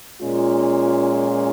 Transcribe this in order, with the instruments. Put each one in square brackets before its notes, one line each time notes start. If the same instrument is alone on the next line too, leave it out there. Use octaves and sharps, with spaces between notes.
[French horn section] A#2 G#3 C#4 F4